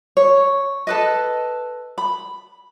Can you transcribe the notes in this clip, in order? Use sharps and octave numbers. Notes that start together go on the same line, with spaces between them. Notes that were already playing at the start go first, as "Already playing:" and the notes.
C#5
A4 B4 D#5
B5